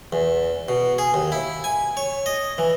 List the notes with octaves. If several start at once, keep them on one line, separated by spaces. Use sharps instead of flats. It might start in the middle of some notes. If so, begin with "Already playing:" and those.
E2
B2
G#4
D#2
E4
G#5
C#5
D#5
E3